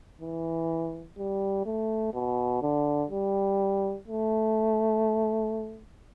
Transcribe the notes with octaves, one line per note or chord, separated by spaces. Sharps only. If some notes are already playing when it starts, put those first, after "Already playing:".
E3
G3
A3
B2
D3
G3
A3